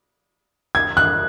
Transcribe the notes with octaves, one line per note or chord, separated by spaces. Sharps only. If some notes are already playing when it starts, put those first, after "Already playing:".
G#6
F#6